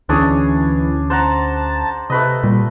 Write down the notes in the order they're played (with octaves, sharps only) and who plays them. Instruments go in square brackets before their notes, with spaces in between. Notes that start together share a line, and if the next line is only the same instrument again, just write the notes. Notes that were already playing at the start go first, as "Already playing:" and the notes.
[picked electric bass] D2 C#4 [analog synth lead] E3 [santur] D4 G#4 C#5
[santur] C5 F#5 A#5 [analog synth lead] A5
[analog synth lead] C3 [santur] A3 B4 D#5
[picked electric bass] A#2 [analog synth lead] G3